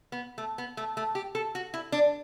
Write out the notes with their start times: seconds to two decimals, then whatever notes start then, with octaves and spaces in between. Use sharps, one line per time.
0.12 B3
0.38 A3
0.58 B3
0.77 A3
0.97 A3
1.15 G4
1.35 A4
1.55 F#4
1.74 E4
1.92 D4